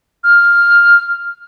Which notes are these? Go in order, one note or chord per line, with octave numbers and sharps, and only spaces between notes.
F6